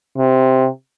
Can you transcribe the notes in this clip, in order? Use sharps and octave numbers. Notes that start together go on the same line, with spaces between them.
C3